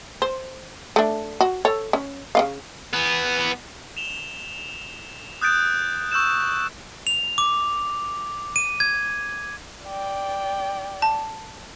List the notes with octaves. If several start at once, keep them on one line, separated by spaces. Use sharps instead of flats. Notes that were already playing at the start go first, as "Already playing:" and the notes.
C5
A3 D4
F#4
A4 C#5
C#4
C#3 D4 F5
E3 B3
E7 F7 G7
D#6 F#6 G6 A6 D7
C#6 E6 G6 E7
F7
D6
D#7
G#6
D5 G5
A5